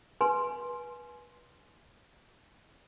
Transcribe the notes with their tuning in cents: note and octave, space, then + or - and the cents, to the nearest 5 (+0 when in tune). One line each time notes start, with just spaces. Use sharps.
B4 -25 G#5 +25 C6 +0